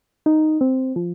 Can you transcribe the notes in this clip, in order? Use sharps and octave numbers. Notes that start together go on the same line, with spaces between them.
D#4
C4
F3